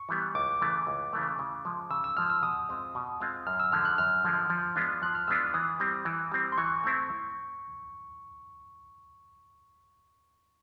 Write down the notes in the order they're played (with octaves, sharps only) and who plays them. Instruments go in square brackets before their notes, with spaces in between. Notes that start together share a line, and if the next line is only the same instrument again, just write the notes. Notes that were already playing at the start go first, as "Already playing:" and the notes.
Already playing: [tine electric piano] C#6
[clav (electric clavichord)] E3 G3 B3
[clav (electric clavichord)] C#2 [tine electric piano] D6
[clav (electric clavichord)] C#3 E3 A3
C#2
C#3 E3 A3
C#3
F3 G#3
[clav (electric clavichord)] C#3 [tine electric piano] E6
[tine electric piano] E6
[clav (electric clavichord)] F3 G#3 [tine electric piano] F6
[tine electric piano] E6
[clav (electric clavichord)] B2 [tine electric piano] D#6
[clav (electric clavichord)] G#3 C4 F4
B2
G#3 C4 F4
[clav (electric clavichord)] F#2 [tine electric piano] F6
[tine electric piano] E6
[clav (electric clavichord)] D3 F3 G#3 [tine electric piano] F6
[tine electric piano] F#6
[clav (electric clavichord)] F#2 [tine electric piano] F6
[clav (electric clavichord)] D3 F3 G#3
F3
G#3 B3 D4 F4
[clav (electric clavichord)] F3 [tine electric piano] F#6
[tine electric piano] F6
[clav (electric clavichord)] G#3 B3 D4 F4 [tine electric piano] E6
[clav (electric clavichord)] E3 [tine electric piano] D#6
[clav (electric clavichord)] G3 C4
E3
G3 C4
[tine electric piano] C6
[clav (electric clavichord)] E3 [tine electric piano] C#6
[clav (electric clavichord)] A3 C4 E4